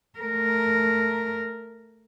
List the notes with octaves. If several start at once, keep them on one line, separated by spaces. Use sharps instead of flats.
A3 A#4